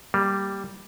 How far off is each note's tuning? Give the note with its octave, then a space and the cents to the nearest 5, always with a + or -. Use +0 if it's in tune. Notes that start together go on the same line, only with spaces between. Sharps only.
G3 +0 A#3 +0